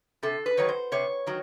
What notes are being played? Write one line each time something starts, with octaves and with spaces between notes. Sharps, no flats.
C3 A4
B4
D#3 F#3 C#5
C5
C3 C#5
D#3 F#3